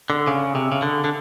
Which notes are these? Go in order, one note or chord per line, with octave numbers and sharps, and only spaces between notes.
D3
C#3
C3
C#3
D3
D3